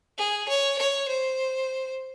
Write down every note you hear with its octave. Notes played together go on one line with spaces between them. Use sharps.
G#4
C#5
C#5
C5